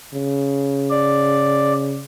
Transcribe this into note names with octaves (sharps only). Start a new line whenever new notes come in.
C#3
D5